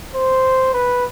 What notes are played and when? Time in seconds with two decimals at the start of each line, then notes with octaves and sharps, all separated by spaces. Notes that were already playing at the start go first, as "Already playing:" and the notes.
0.15 C5
0.74 B4